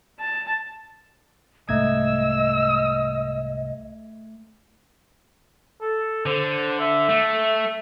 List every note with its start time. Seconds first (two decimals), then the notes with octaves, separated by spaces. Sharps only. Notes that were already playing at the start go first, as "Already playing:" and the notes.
0.20 A5
1.69 C2 G#2 A3 D#5 E6 G#6
5.82 A4
6.26 D3 C5
6.79 E5
7.09 A3